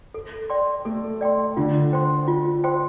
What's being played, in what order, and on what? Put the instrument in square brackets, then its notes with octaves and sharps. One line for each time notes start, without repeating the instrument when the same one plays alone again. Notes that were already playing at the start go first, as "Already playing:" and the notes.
[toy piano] A4
D5 G5 C6
[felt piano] A3 [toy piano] A4
[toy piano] D5 G5 C6
[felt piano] D3 [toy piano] F4
[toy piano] C5 G5 C6
F4
C5 G5 C6